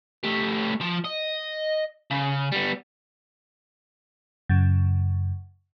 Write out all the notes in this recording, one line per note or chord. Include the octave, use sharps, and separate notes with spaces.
A3 G4
F3
D#5
C#3
G3 B3
F#2 C#3